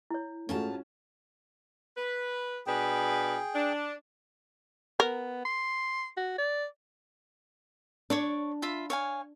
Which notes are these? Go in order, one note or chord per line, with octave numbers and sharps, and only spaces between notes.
E4 C#5
G#2 A3 C#4 F4 F#4 A5
B4
B2 D4 G#4 B4 G5
D4
B3 A#4
C6
F#4
D5
D4 C#5 C#6 D6
F4 E5 B5
C#5 F5 G#5